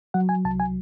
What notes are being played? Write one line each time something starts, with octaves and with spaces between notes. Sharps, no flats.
F#3 F#5
G#5
C2 A5
G#5